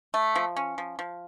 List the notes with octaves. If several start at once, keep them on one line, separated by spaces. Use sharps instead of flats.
A3
F3
C#4
F3
F3